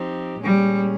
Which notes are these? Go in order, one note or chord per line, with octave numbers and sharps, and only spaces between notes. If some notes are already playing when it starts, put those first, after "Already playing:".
Already playing: F3 C4 D#4 G4
A#2 G3 G#3 C#4 G#4